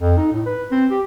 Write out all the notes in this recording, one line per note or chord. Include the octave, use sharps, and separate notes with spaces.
F2
D#4
A2
B4
C4
G4